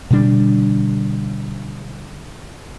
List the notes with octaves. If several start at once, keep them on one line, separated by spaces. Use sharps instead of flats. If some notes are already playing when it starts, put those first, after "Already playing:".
B2 D3 G3 D4